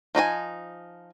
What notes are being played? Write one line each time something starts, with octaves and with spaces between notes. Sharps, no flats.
F3 D#4 G#4 G#5